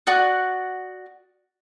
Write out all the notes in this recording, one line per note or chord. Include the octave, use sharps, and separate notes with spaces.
F#4 D5 F#5 D#6